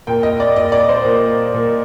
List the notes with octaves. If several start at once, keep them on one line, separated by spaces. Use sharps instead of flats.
A#2 G5
D#5
D5
A#2 D#5
D5
C5
A#2
A#2